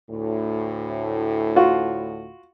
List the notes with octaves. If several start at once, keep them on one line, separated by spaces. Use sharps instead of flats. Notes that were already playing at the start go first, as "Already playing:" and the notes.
D2 A2
F4 F#4